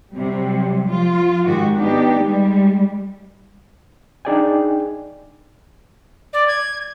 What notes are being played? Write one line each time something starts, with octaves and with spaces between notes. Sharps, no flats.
C3 F#3 G3
F3 F4
G#2 D#3 G#3 F#4 G4
B3 D4 D#4 G4
G3 G#3
D4 D#4 G#4 D5 G5 G#5
D5
G#6